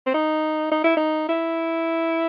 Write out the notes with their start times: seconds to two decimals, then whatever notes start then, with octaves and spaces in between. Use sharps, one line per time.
0.07 C4
0.14 D#4
0.72 D#4
0.84 E4
0.97 D#4
1.29 E4